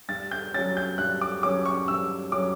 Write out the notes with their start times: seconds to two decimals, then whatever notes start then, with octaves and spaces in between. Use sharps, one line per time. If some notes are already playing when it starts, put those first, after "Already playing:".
0.09 G2 A6
0.31 G6
0.54 F#3 C#4 A6
0.77 G6
0.98 G2 F#6
1.21 D6
1.43 F#3 C#4 D6
1.65 C#6
1.88 G2 E6
2.32 F#3 C#4 D6